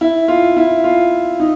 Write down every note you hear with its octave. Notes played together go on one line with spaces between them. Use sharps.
E4
F4
E4
F4
D#4